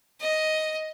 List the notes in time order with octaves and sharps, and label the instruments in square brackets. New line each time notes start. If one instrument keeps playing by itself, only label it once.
[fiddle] D#5